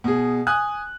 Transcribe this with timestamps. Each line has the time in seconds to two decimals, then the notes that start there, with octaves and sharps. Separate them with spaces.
0.04 B2 G#4
0.47 G#5 D#6 F#6